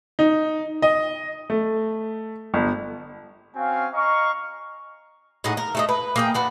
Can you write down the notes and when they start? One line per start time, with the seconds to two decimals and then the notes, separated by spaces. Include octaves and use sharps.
0.19 D#4
0.82 D#5
1.50 A3
2.54 G1
3.56 C4 C#4 F#4 F5 G#5
3.93 D#5 F5 A#5 C#6
5.44 A2 D#4 G#4 F#5
5.57 A#4
5.75 A3 A4 D#5
5.89 B4
6.16 A#3 G#4 G5
6.34 D4 F#4 B4